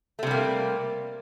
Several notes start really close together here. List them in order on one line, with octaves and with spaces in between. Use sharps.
A3 C3 G3 A#3